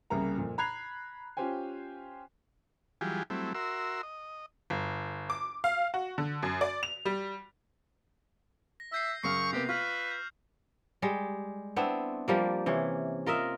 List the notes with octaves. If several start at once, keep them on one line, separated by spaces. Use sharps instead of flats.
C2 C#3 G3 A#3 A#5
F2 A#2
A#5 B5 F#6 G#6 C7 F7
C#4 F4 G4 C5 G5 G#5
E3 F#3 G3 F4 G4 G#4
F#3 G3 A3 C4 E4
F#4 A#4 E5 C6 E6
D#5
G1
D6
F5
F#4
D3
F#2
D5
F7
G3
A#6
E5 E6 G6 C7
F#2 C#3 C#6 F6 C7 F7
C3 A#3 B3 G4
F4 B4 C#6 F6 F#7
G6
G3 G#3
B3 C4 D4 E4
F3 G3 A#3
C3 E3 C#4
F4 A#4 D#5 E5